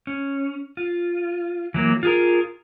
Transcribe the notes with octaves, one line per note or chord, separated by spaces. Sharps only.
C#4
F4
E3 F#3 A#3
F4 G#4 A#4